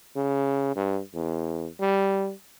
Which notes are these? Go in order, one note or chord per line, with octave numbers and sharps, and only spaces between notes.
C#3
G2
E2
G3